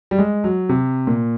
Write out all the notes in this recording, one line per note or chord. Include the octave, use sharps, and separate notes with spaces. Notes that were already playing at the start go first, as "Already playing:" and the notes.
G3
G#3
F#3
C3
A#2